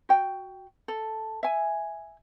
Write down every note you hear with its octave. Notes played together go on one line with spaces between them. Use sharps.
F#4 G5
A4
E5 G#5